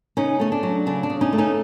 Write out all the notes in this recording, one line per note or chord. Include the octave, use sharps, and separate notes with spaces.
C#3 C#4 D#4
A3 C#4
D4
F#3
C#3 D4
D4
C#3
C#4 D#4
A3
C#4 D#4